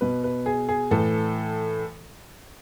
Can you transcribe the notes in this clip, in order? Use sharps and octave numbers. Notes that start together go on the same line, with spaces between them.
B2 B4
B4
G#4
G#4
A2 E3 A4